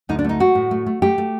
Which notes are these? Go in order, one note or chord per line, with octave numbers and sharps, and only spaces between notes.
D2 D#4
D4
A3 D#4
A3 F#4
A2
A3
A3
A3 G4
A3